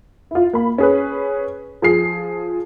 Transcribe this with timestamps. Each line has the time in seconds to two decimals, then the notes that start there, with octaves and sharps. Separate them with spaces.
0.31 E4 F4
0.53 A#3 B5
0.78 C#4 G#4 B4
1.82 F3 G#4 C7